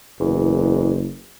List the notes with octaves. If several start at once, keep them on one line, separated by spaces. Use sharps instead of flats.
F#1 E2